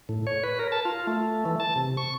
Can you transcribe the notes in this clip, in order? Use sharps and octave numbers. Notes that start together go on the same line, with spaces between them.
A2
C#5
B4
A#4
A5
F4
A3
E3
A5
C3
C#6